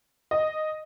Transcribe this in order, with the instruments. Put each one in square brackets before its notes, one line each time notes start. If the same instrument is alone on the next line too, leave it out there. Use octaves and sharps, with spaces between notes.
[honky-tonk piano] D#5